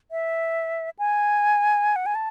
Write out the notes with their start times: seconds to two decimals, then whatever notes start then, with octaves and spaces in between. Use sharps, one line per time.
0.11 E5
0.99 G#5
1.96 F#5
2.06 G#5
2.15 A5